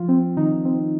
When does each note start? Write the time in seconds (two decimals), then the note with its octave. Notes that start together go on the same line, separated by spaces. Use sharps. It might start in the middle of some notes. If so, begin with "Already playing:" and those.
Already playing: F3 F4
0.09 C4
0.37 D#3 D#4
0.65 C4